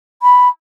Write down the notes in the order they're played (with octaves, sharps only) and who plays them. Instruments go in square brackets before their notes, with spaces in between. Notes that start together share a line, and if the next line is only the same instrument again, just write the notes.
[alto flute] B5